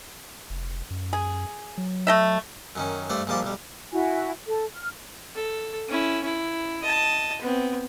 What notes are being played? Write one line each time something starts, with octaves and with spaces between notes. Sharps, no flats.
F1
F#2
G#4
F#3
A3 D#5 E5
F#2 D#3 C#4
G2 A3 C5 D5
A#1 G#2 F3 G3 A5 D6
B1 G3
E4 F#4 G#5
A4
F6
A4
C#4 E4
E4
D#5 A5
B3 C4